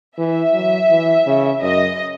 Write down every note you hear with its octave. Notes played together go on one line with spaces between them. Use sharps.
E3 E5
F#3
E3
C#3
F#2 D#5